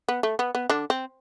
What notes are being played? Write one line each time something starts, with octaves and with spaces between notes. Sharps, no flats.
B3
A3
B3
B3
D3 D4
C4